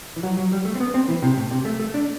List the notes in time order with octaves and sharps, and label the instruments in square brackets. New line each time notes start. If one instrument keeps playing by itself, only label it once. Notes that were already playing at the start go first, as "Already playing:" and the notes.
[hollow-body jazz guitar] E3
F#3
F#3
G3
A3
C4
B3
C4
E3
C3
A2
C3
A3
A3
D4